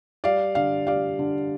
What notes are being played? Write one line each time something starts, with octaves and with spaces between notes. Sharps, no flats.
G3 D5 F5
D3 D5 F5
G3 D5 F5
D3